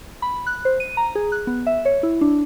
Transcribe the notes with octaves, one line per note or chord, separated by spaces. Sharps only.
B5
F#6
C5
D#7
A#5
G#4
F#6
B3
E5
C#5
E4
D4